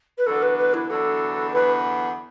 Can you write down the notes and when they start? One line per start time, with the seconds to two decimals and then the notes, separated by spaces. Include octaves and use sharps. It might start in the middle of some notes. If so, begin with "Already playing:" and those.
0.17 B4
0.26 E2 D3 F#3 B3 D4 A4
0.42 B4
0.58 B4
0.73 E4
0.89 E2 D3 F#3 B3 D4 A4
1.52 E2 D3 F#3 B3 D4 B4